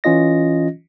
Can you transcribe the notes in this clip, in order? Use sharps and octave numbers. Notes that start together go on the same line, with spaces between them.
E3 C#4 F4 D#5 A#6